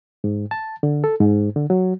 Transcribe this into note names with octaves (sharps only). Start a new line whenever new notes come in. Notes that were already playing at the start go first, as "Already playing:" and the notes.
G#2
A5
D3
A4
G#2
D3
F#3